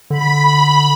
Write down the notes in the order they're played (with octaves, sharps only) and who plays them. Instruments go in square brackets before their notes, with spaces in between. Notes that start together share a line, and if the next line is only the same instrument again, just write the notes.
[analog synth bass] D3 [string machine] B5